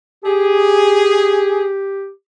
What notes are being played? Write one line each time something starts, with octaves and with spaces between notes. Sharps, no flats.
G4 G#4